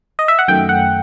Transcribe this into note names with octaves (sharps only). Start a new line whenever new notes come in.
D#5
E5
F#5
F#2 D#3 A3 G5
F#5